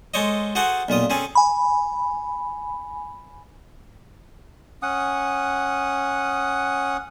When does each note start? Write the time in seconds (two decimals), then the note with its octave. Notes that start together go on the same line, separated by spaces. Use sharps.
0.14 G#3 A4 C5 C#5 D#5
0.55 F#4 G#4 A4 C5 F#5
0.88 B1 A#2 F4 D#6
1.10 C4 C#4 G#4 A4
1.35 G#5 B5
4.83 C#4 F#5 D#6